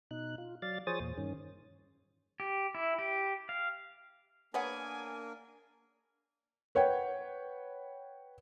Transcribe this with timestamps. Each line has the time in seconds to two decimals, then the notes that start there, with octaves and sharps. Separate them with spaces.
0.11 B2 D#4 F#6
0.38 F4
0.62 F#3 D5 F5 A6
0.87 F3 G#4 C5 C#5 D#6 A6
1.00 E2 A#2
1.18 G2 D#3 C#4
2.40 G4
2.75 E4
2.99 G4
3.49 F5
4.54 A#3 B3 D4 G#4 A#4 C#5 F#5 G#5
6.75 B4 C#5 F#5 G5